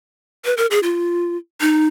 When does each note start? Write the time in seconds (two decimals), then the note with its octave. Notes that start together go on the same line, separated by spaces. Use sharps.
0.45 B4
0.57 A#4
0.71 G#4
0.83 F4
1.61 D#4